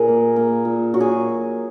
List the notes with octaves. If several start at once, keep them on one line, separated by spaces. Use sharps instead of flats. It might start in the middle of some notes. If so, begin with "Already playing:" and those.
Already playing: A#2 G#4 A#4
A#3
A#3
A#2
F#3 F#4
G#4